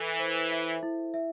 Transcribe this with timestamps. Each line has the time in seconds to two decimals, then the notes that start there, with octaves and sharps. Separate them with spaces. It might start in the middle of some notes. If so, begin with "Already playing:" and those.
Already playing: E3 A4
0.19 C5
0.51 E5
0.83 E4
1.14 E5